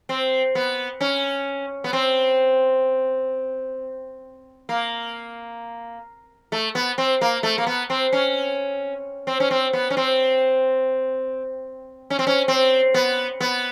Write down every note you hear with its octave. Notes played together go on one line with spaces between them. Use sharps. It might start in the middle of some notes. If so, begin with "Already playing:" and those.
C4
B3
C#4
B3
C4
A#3
A3
B3
C4
A#3
A3
A#3
B3
C4
C#4
C4
C#4
C4
B3
C#4
C4
C#4
C4
C#4
C4
B3
B3